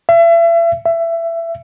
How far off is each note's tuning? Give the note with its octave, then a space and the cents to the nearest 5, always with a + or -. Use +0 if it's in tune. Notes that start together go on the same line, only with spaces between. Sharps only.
E5 +35
E5 +20